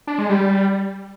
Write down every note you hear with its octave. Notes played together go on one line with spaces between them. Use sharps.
D4
G#3
G3